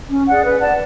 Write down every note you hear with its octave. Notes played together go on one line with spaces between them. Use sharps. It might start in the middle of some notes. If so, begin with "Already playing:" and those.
C#4
G#4 D5 F#5
B4
D5 F#5 A5